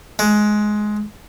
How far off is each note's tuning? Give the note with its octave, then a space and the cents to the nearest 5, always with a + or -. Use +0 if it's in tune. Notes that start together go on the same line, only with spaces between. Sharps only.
G#3 +15